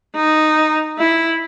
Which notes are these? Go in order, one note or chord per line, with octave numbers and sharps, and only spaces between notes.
D#4
E4